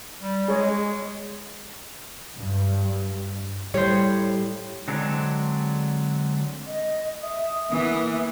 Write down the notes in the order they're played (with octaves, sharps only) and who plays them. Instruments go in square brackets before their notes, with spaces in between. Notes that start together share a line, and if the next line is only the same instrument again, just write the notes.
[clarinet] G3
[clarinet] G#3 [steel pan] G#4 C#5 D#5
[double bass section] G2
[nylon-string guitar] A2 G3 [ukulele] C5 C#5
[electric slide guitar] D3 F#3 G#3 C4 D4
[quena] D#5
[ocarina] E5 [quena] D#6
[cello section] E3 B3 [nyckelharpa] A#3 [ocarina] E5